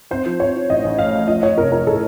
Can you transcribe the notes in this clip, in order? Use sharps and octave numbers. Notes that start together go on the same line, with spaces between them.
C4 C5
F3
C4 C#5
F4
A1 D#5
A1
A3 F5
A3
F3 D#5
F3 C#5
F1 A#4
F3 A#4
A2 A4